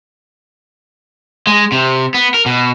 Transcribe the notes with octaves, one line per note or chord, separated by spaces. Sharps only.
G#3
C3
B3
A#4
B2